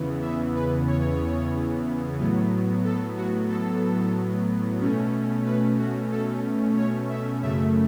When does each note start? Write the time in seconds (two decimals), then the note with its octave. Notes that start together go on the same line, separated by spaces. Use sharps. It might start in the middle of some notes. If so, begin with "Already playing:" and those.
Already playing: E2 C#3 E3 B3
0.22 E5
0.56 B4
0.88 C#5
2.19 A2 F#3 B3
2.85 A4
3.17 F#4
3.49 A4
4.81 B2 A3 C#4
5.46 B4
5.78 F#4
6.12 A4
6.76 C#5
7.09 E5
7.42 F#2 C#3 A3 E5